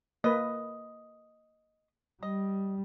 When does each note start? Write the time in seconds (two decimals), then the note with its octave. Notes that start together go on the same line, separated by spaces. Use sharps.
0.24 A#3 B4 D#5
2.23 G3 D#5